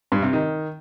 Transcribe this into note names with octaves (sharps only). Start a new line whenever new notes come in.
G2
C3
D#3